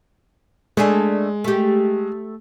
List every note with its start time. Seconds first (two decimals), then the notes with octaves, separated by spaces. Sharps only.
0.77 G#3 A3 D4 G#4
1.44 A3 G4